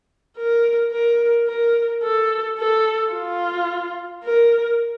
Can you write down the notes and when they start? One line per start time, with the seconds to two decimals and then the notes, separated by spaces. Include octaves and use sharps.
0.37 A#4
0.92 A#4
1.47 A#4
2.03 A4
2.59 A4
3.13 F4
4.24 A#4